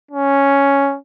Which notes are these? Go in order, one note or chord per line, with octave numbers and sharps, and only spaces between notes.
C#4